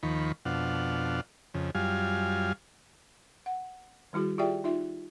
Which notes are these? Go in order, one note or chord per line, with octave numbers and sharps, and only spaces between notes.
D#2 D#3 F3 B5 C#6
F2 B2 D4 F5 F#5
F2 C#3
F#2 G3 F4 F5 G#5
F#5
D#3 G3 E4 F#4 G#4
F4 G4 G#4 D5 E5 G5
D#4 F4 E5